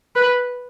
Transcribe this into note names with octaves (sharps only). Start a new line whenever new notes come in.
B4